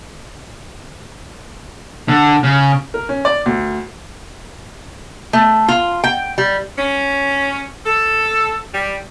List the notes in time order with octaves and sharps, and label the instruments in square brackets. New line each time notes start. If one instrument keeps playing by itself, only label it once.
[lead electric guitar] D3
C#3
[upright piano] A#4
C#4
D5
D2
[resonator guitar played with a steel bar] A3
F4
G5
G3
[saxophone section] C#4
A4
G3